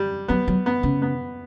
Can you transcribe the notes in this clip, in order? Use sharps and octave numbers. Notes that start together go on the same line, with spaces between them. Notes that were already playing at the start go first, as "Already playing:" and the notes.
Already playing: G3
F#3 B3
F#3
B3
C#3
B3